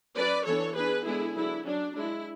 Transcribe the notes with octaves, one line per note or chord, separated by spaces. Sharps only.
F#3 C#4 B4 D5
E3 B3 D4 A4 C#5
E3 B3 D4 G#4 B4
D3 G#3 B3 D4 E4 G#4
D3 F#3 B3 D4 E4
F#3 C#4 D4
G#3 D4 E4